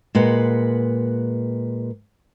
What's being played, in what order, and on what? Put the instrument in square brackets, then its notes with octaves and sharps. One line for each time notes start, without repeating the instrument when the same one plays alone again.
[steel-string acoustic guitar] A#2 G#3 B4 F#5